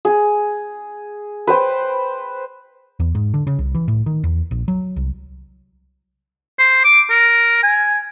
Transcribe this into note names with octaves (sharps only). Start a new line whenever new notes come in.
G#4
B4 C5 G5
E2
G#2
D3
C#3
C2
E3
A2
D#3
E2
A#1
F#3
C2
C5
D6
A#4
G#5